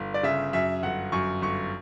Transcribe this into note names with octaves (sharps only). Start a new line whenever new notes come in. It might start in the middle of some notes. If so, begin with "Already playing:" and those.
Already playing: G1
D5
C#3 E5
F#2 E5
G1 F#5
F#2 C#6
G1 C#6